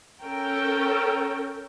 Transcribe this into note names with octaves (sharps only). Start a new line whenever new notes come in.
C#4 A4 A#4 G5